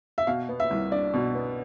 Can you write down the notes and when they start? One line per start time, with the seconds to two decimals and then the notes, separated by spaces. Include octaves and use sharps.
0.18 E5
0.27 B2 F5
0.49 B3
0.60 E5
0.71 C2
0.92 D4 D5
1.14 B2
1.35 B3